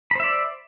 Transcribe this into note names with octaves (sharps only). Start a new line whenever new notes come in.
C5 D5 E5 B5